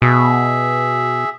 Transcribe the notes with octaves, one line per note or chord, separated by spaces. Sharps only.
B2 G#4 E5